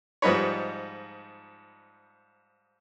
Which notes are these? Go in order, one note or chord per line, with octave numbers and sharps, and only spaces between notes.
G#2 F3 G3 D#4 B4 C#5